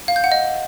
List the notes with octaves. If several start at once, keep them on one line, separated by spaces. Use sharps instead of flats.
F5
G6
F#5
D#5